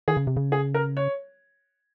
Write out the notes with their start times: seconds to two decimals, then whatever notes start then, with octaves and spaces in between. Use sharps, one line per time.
0.08 D#3 G#4
0.17 C#3
0.27 C3
0.37 C#3
0.52 G#4
0.74 A#4
0.97 C#5